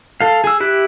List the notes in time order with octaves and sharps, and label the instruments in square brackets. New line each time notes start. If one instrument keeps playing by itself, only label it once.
[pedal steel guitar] A4 F5
G#4 E6
E4 G4 F#6